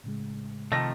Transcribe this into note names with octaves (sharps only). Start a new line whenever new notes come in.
A2 C#3 G#3
C3 D#3 F3 A3 D#5 A5 A#6